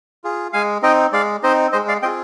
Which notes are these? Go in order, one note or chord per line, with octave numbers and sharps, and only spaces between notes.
F4 G#4
G#3 F5 G#5
C4 D#4 D#5 G5
G#3 D5 F5
C4 D#4 C5 D#5
G#3 C5 D#5
D5 F5
C4 F4 G#4 D#5 G5